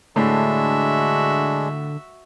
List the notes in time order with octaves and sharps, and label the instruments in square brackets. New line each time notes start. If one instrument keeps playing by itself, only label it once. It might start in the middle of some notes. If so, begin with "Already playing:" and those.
[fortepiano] A2 [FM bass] D3 [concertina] G#3 D4 [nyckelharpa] F#4 E5